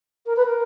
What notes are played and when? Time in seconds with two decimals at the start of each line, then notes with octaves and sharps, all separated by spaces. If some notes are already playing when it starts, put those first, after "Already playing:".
0.26 A#4
0.36 B4
0.45 A#4